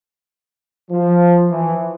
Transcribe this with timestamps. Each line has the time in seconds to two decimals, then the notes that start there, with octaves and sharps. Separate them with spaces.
0.90 F3
1.50 E3